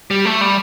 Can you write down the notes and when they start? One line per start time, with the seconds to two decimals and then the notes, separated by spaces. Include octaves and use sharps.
0.11 G3
0.25 A3
0.41 G3